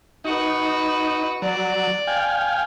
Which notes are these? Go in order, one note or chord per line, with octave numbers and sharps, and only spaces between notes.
D#4 F#4 B4
F#3 D5
F5 G5 G#5